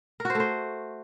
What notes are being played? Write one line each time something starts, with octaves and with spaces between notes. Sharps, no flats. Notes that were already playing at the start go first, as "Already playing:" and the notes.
A#4
F#4
C5
A3
C5